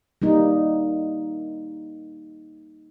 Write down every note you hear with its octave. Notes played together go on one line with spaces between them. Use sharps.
G3 A#3 D#4